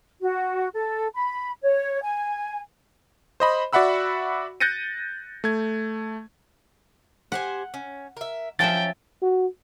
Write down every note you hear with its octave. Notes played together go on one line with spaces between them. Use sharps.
F#4
A4
B5
C#5
G#5
C5 D#5 B5
F#4 D5 E5 F#5 B5 E6
F#6 G6 A6 A#6 C#7 D#7
A3 G#6
G4 C5 F#5 G#5
C#4
A#4 E5
F3 F#3 C#4 A#4 E5 G5 A6
F#4